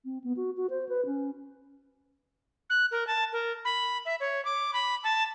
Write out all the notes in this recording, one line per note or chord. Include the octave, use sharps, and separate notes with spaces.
C4
B3
F#4
F#4
C5
B4
C#4
F#6
A#4
A5
A#4
B5
E5
C#5
D6
B5
A5